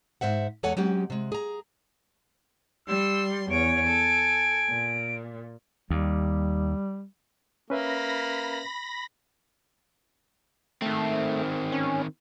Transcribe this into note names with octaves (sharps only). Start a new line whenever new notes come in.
G#2 C5 E5 F#5
E2 G#3 A4 C#5 F#5 G#5
F#3 G#3 C4 C#4 G4
C3 G#3
G#4 A#5
G3 C6 E6
E2 C#5 G#5 D7
A4
A#2
D#2 G3
A#3 C#4 B4 E5 B5 A#6
D#3 A3 C4
C#4